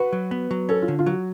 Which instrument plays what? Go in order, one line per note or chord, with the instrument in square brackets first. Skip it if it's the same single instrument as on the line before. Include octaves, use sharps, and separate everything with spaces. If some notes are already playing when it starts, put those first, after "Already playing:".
Already playing: [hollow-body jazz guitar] F#4 [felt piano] B4
[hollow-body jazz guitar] F#3
B3
F#3
[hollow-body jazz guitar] C#4 [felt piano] A4
[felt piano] F4
[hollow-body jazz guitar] D3
[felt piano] F4
[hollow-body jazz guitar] F#3 [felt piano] F#4